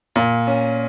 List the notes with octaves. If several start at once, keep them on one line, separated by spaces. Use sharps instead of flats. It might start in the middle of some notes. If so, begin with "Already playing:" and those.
A#2
C#4